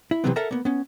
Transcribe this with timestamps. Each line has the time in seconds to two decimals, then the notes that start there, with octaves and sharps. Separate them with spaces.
0.11 E4
0.24 C3 D#3 E3 F#3 B3 C4
0.36 A4 A#4 E5 F#5 A5 A#5
0.51 A#3 B3
0.65 B3 C#4